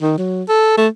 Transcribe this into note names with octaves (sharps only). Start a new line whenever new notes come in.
D#3
F#3
A4
A3